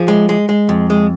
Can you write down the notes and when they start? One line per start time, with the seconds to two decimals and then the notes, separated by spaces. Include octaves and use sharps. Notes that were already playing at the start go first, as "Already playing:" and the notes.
Already playing: F3 G#4
0.08 G#3
0.29 G#3
0.49 G#3
0.69 F2
0.90 G#3